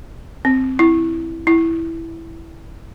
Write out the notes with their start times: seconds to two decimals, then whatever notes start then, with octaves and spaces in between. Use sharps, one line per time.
0.45 C4
0.79 E4
1.47 E4